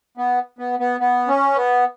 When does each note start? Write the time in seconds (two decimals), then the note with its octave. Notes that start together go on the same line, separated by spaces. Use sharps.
0.17 B3
0.59 B3
0.79 B3
1.00 B3
1.28 C#4
1.55 B3